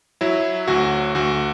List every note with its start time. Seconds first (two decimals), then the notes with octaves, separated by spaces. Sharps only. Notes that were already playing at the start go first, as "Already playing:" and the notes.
0.21 F#3 E4
0.68 D2 F#4
1.15 D2 F#4